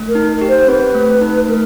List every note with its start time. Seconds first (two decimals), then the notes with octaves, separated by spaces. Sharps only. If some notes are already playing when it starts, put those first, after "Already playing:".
Already playing: A3
0.09 A#4
0.15 D#4
0.41 G4
0.49 C5
0.68 C4 B4
0.94 A3
1.21 D#4
1.48 A3 A#4